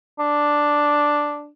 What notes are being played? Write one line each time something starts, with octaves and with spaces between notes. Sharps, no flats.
D4